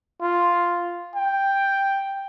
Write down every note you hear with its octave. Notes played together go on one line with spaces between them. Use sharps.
F4
G5